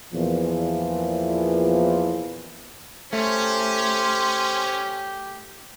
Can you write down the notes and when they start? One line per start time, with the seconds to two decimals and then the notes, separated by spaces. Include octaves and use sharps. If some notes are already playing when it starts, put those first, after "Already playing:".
0.13 E2 A#2 E3 F3
3.13 A3 C#4 G4 C5